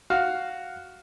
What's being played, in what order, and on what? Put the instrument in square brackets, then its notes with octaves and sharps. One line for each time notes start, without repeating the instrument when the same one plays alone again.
[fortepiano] F#4 F5